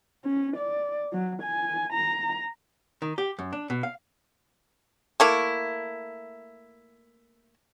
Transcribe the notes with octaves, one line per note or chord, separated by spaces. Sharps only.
C#4
D5
F#3
G#5
A#5
D#3
G4
F#2
D4
B2
F5
A3 A#3 E4